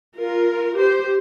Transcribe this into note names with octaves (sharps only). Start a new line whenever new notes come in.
F4 A#4
G4 C5